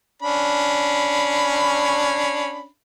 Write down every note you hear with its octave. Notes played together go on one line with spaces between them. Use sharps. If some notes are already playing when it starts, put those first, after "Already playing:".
C#4 D4 B5